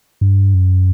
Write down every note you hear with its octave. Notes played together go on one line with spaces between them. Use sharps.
G2
F#2